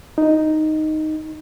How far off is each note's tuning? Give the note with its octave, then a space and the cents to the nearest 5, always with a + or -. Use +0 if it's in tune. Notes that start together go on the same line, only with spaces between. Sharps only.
D#4 +0